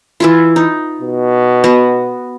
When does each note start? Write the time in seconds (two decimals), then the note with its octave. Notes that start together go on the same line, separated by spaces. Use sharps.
0.20 E3 E4 F4
0.56 D#4
1.01 B2
1.64 B3 F#4